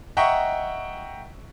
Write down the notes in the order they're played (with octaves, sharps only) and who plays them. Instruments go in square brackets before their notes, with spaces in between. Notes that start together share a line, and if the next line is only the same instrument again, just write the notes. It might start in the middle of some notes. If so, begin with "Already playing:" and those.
[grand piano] D#5 E5 F#5 G5 A#5 C#6